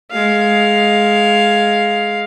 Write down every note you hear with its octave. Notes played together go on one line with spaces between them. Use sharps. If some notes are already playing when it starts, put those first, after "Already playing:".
G#3 F5